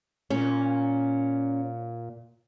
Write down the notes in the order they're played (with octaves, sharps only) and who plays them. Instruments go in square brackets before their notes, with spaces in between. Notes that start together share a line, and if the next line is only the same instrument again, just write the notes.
[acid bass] A#2 [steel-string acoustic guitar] C#4